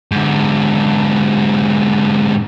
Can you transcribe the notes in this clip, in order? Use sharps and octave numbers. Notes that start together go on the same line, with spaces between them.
G#2 D3